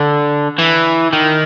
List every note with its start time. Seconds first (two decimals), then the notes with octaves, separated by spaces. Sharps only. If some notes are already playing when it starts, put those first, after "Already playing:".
Already playing: D3
0.58 E3
1.13 D#3